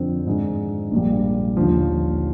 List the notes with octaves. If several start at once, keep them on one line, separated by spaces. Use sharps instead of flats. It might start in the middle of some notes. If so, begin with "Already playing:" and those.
Already playing: F2 D3 F3 C4 F4
G#2 D#3 G#3 D4
A#1 A#2 G3
D#2 D3 F3